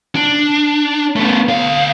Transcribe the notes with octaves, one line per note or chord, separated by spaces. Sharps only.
D4
A3 B3
D2 F5